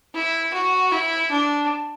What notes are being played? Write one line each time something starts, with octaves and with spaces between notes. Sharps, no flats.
E4
F#4
E4
D4